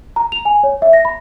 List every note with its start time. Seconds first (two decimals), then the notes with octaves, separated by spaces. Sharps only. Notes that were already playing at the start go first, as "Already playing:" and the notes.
0.16 A#5
0.32 F7
0.45 G#5
0.63 C#5
0.82 E5
0.93 A#6
1.05 B5